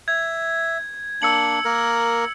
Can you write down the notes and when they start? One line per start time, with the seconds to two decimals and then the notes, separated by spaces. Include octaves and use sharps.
0.08 E5 G#6
1.22 A#3 D4 E6 C#7 F#7
1.65 A#3 A#4